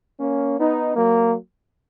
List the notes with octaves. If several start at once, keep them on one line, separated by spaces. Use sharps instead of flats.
A#3 C#4
B3 D#4
F#3 A#3